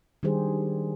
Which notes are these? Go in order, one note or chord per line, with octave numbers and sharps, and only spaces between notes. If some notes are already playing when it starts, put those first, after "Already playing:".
D#3 G3 D4 G4 G#4 C5